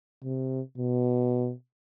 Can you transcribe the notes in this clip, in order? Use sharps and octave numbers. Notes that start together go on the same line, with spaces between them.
C3
B2